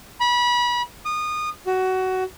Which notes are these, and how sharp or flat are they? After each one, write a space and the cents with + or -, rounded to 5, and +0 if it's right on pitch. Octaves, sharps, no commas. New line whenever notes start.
B5 -30
D#6 -25
F#4 +15